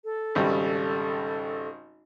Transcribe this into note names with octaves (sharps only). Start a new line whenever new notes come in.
A4
G#1 C#3 G3